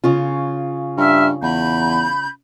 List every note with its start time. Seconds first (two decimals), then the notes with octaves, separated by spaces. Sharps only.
0.04 C#3 C#4 F4
0.97 G2 E5 F6
1.42 E2 B5 G6